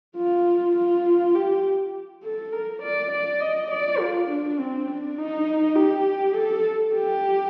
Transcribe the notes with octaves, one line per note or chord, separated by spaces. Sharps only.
F4
F4
G4
A4
A#4
D5
D5
D#5
D5
F4
D4
C4
D4
D#4
G4
A4
G4